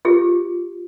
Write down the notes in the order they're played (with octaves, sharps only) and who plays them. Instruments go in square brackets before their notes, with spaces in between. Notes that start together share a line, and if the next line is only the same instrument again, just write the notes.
[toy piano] F4 G4 G#4